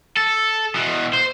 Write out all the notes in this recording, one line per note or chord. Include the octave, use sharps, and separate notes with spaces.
A4
B2 E3
C5